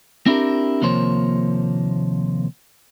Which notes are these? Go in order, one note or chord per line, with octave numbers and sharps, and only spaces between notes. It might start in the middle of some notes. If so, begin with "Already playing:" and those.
C4 D4 E4 G4 A#4
D#2 C3 F3 A#3 C5 C#5